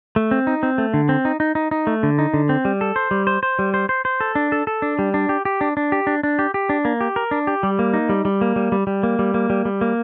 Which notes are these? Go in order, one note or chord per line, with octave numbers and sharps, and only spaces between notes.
A3
C4
D#4
C4
A3
D3
C4
D#4
D#4
D#4
D#4
A3
D3
D#4
D3
C4
G3
A4
C5
G3
C5
C5
G3
C5
C5
C5
A4
D4
A4
A4
D4
G3
D4
G4
G4
D4
D4
G4
D4
D4
G4
G4
D4
A#3
G4
A#4
D4
G4
G3
A#3
D#4
G3
G3
A#3
G3
G3
G3
A#3
G3
A#3
G3
G3
A#3